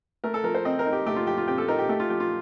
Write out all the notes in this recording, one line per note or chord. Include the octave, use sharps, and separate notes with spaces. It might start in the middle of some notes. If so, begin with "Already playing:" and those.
A3 A#4
A4
F3 A#4
C5
C4 D#5
A#4
D#4
G4
A3 G4
F4
F3 G4
F4
C4 G4
A4
D#4 A#4
G4
A3 G4
F4
F3 G4
F4